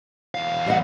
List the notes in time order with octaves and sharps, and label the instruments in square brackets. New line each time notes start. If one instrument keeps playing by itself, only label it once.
[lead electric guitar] E2 F5
[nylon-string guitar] G3 D#5 F#5